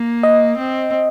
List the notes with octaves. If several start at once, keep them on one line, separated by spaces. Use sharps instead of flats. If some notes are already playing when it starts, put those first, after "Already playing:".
Already playing: A#3
D#5
C4